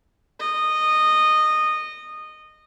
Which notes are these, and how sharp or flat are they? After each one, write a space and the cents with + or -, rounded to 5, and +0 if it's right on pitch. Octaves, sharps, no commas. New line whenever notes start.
D#5 -15